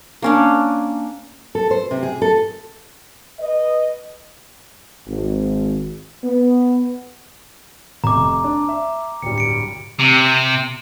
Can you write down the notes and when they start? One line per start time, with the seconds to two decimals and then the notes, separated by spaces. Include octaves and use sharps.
0.22 A#3 C#4 D4
1.55 A4
1.71 C5
1.91 C3
2.03 G#4
2.22 A4
3.39 B4 D#5
5.07 G#1
6.24 B3
8.04 F1 A#5 D6
8.44 D4
8.69 E5
9.22 D1 G2 C#7
9.38 C#7 D7
9.99 C3